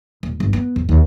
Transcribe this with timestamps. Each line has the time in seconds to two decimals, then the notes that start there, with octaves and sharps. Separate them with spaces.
0.23 D#1
0.40 G1
0.53 B3
0.76 F2
0.89 D#2